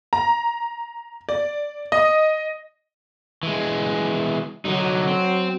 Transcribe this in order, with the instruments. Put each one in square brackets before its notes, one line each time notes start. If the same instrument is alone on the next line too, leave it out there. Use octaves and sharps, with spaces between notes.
[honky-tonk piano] A#5
D5
D#5
[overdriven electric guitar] E3 G#3
[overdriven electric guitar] D3 D#4 [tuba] F#3
[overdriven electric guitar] C4